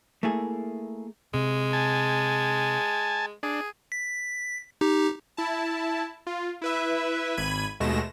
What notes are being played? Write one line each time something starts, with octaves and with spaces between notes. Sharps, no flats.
A3 A#3 E4 G#4
C3 G#3
G#5 A5
D4 G#4
B6
D#4 G4
E4 A5
F4
E4 B4 E5
G#1 B5 G#6 D#7
D#2 B2 G#3 A3 A#6 E7